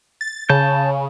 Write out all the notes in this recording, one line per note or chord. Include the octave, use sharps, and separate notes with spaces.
A6
C#3 A5 G6